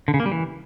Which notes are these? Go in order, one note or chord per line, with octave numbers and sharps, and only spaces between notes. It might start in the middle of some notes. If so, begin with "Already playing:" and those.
D3
C#3
A#3
G3
E3